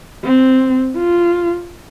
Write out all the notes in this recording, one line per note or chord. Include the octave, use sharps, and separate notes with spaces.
C4
F4